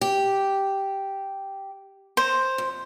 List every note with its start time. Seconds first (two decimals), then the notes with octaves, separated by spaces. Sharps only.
0.01 G4
2.17 C5 A#5
2.58 F2